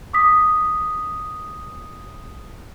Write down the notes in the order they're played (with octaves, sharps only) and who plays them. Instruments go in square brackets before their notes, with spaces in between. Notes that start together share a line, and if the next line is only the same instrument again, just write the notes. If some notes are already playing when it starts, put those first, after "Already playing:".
[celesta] D6 D#6 B6